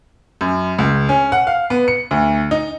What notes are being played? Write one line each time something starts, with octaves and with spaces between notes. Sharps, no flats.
F#2
C#2
C#4
F#5
F5
B3
C#7
D2
D#4